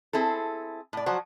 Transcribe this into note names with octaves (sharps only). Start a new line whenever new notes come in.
C4 E4 G#4 A4
A2 D5
F3 F#3 F#4 C5